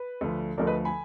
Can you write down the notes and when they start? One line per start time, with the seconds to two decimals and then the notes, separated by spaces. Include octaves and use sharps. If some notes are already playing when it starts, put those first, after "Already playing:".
Already playing: B4
0.21 D2 D3 F3
0.58 D2 D3 F3 A#4 D5
0.67 B4 D#5
0.85 G#5 B5